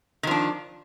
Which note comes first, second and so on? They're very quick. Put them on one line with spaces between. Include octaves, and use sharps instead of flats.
D#3 F3 D4